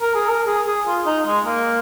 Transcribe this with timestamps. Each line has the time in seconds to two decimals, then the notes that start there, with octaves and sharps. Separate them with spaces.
0.01 A#4
0.15 G#4
0.29 A#4
0.47 G#4
0.67 G#4
0.87 F4
1.06 D#4
1.27 G#3
1.46 A#3